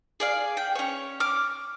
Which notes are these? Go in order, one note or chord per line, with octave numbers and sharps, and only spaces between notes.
G#4 D5 F5
G5
C#4 C#5
D6 F6